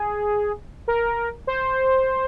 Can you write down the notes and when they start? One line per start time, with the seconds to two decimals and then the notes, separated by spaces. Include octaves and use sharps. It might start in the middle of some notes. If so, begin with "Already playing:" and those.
Already playing: G#4
0.88 A#4
1.47 C5